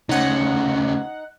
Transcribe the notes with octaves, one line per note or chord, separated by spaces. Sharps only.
D2 C#3 D#4 F#5